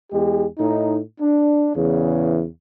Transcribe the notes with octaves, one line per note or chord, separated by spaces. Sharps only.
E2 G#3 G4
A2 D#4
D4
E2 C#3 E3